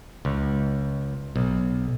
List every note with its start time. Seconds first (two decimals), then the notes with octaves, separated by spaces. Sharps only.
0.25 C#2
1.36 B1